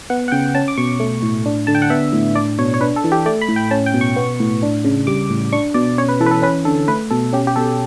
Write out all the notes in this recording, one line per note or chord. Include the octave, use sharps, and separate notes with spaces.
B3 F#5
F#5
C#3 G5
C#4 A5
D6
B2 C#6
A3
A2
D4
D3 A5
G5
F#5
B3 E5
A2
D4 D5
B2 C#5
C#5
D4 B4
A4
E3
G4
A3 D5
B5
A2
G5
C#4 A5
G5
B2
C#6
B3
A2
D4
C#3
G3 D6
A2
D4 C#6
B2 D5
C#4 C#5
B4
E3 A4
B4
A4
C#4 B4
D3 A4
A3 B4
B2 A4
C#4 G4
G4
B2 A4